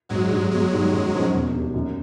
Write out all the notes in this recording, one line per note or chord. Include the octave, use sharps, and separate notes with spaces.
G#1 F#3 G#3
G2 D3
G1 F#3 G#3
G2 D#3
F#2
D3 F3 A#3 C#4
E1
D#2 D3
F#2